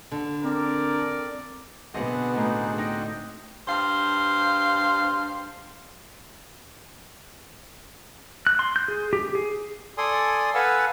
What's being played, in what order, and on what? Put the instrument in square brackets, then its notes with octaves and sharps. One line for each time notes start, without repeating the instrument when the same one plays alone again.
[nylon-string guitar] D3
[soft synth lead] C4 [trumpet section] A#4 D5
[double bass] B2 B3 [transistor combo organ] D3 C4 F#4 [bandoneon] G#4 F#5 [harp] D#5
[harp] A2 [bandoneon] D#4 G#4
[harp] D#4 [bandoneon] D#5 G5
[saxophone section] G2 C5 F5
[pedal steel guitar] F#6
C6
G6
G#4
G4
G#4
[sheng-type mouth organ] A4 D5 G#5 C6 D#6
A4 B4 F5 F#5 G#5 E6